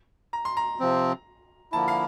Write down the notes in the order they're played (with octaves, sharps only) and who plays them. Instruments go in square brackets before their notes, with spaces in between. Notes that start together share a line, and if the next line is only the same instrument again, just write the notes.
[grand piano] A#5
C6
A#5
[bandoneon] C3 F3 C4
[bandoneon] D3 F3 A#3 E4 [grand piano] A5
[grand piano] F5